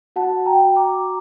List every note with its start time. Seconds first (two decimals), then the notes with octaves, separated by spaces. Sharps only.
0.16 F#4 F#5 A5
0.46 G5 A#5
0.61 F#4
0.76 A#5 D6